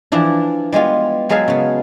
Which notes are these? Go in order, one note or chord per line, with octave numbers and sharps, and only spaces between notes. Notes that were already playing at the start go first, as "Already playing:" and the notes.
E3 F3 D4 E4
G3 G#3 B3 F4
F#3 G#3 G#4 A4 B4 F5
C#3 B3